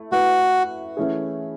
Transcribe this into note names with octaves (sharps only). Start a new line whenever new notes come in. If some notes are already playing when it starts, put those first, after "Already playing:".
Already playing: A3 E4
A3 E4 F#4 B4
E3 A3 C#4 E4 G#4